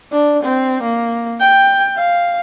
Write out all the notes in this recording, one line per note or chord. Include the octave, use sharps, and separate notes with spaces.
D4
C4
A#3
G5
F5